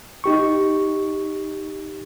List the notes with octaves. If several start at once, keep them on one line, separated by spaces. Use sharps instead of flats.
D#4 G4 C#6